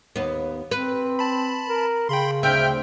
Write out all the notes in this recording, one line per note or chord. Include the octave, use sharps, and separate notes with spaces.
D#2 B3
C4 B4
A5 B5
A#4
C#3 G5 B5 C6
D2 C4 E5 G5 F6